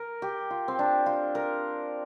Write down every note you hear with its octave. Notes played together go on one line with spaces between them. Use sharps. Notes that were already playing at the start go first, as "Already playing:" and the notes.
Already playing: A#4
G4
F4
C4
D4
F4
A#4